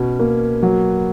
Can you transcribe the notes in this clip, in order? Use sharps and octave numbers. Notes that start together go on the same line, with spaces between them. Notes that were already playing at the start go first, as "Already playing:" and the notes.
Already playing: B2 C#4
A#3
F#3